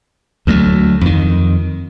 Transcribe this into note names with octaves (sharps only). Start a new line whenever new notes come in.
D2 F#3 A3
F2 D#3